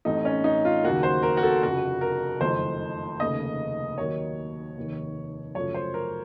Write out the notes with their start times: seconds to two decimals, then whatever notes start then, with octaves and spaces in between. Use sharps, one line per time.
0.05 A1 A2 A3 C4 D#4
0.25 C#4
0.44 D#4
0.65 F4
0.83 D#2 C#3 F#3 A#3 F#4
1.03 C5
1.23 A#4
1.37 F#4
1.43 A4
1.63 F1 F2 C#3 F#4
2.01 A#4
2.41 F#1 F2 D#3 A3 C5
3.20 F1 D#2 C#3 A3 D#5
3.98 D#2 D#3 F#3 A#3 C#5
4.77 F1 D#2 D#3
5.55 F#2 C#3 F3 A3 C#5
5.74 C5
5.94 A#4